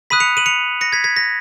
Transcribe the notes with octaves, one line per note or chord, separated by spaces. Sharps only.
B5 D#6 F#6 B6 D#7
C#7 F7
D#7 F#7
C#7 F7
A#6 C#7
G#6 B6
G#6 B6
A#6